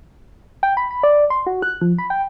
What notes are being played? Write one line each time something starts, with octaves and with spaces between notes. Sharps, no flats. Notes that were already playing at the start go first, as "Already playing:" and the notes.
G5
B5
B5
D5
C6
F#4
F#6
F3
B5
G5